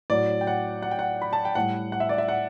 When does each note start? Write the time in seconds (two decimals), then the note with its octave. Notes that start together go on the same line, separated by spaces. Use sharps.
0.10 A2 F#3 D5
0.41 G5
0.47 F#5
0.82 F#5
0.91 G5
0.99 F#5
1.22 B5
1.33 A5
1.45 G5
1.55 A2 G3 F#5
1.92 F#5
2.00 E5
2.09 D5
2.18 E5
2.28 F#5